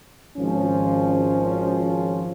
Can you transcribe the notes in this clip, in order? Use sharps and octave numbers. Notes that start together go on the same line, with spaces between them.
G#1 F3 C#4